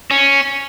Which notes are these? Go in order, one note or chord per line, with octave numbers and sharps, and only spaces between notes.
C#4